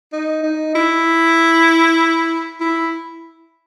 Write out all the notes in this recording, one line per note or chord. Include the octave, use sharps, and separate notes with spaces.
D#4
D#4
E4
E4